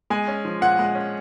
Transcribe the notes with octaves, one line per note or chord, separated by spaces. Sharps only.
G#3 G#5
C#4
F3
A#2 F#5
G#3
C#4